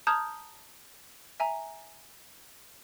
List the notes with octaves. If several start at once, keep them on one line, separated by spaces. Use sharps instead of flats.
A5 A#5 D#6 F6 G6 G#6
E5 G#5 A#5